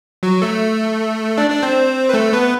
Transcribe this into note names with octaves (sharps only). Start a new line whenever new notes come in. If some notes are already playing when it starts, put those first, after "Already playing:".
F#3 F#4
A3 A4
D4 D5
D4 D5
C4 C5
B4
A3 A4
B3 B4